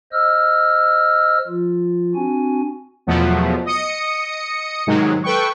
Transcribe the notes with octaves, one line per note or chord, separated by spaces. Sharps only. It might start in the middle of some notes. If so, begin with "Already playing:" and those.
C5 D#5 E6 F6
F3 F4
C4 D4 F#4 G#5
E2 B2 F3 F#3 A3 B3
D#5 D#6 C#7
G#2 C3 D#3 F#3 G#3
A4 B4 G5 C#6